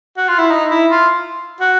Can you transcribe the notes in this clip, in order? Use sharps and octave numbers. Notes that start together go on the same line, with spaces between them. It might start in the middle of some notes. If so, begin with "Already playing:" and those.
F#4
F4
E4
D#4
E4
F4
F#4